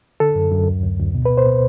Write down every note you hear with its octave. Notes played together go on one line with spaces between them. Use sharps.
D3 A4
F#2
F#2
D2
D2
D2
B2
B2 B4
C5
B2